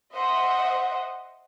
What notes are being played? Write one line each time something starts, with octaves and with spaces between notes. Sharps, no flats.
C5 D#5 E5 F#5